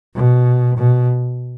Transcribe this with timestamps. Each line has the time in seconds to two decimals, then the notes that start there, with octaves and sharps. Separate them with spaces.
0.15 B2
0.78 B2